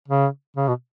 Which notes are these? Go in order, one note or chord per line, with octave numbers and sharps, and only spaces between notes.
C#3
C#3
B2